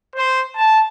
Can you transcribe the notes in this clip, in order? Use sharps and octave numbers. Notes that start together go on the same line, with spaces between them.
C5
A5